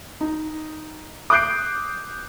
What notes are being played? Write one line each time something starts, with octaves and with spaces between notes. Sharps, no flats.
D#4
D6 D#6 F#6 G6 C7 D7